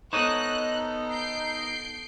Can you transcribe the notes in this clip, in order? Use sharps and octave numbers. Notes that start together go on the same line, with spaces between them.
B3 D#4 A4 C5 C#5 D#5 F#6
G6 C7 D7